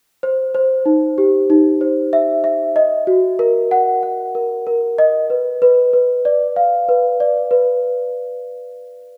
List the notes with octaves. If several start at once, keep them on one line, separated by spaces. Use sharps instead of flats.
C5
C5
D#4
G4
D#4
C5
E5
E5
D#5
F#4
A#4
F#5
F#5
A#4
A#4
D#5
B4
B4
B4
D5
F5
B4
D5
B4